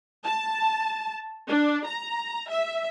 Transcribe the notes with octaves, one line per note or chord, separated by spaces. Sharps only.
A5
D4
A#5
E5